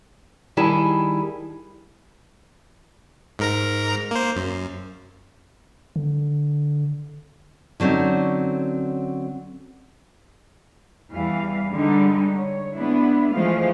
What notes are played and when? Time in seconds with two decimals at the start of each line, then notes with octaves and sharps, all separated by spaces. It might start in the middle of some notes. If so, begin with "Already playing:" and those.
0.57 D#3 G3 E4 G#4 A5
3.39 G#2 A#4 A#5
4.11 A#3 C5
4.36 F#2
5.96 D3
7.80 D3 F#3 C4 C#4 D#4
11.12 E2 E3 G3 F5
11.71 D3 G3 G#3 D#4
12.38 C#5
12.75 G#3 B3 D4 E4
13.33 E3 F3 G#3 A3 F5